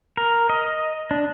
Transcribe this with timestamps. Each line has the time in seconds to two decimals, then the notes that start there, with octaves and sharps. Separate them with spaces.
0.17 A#4
0.50 D#5
1.11 D4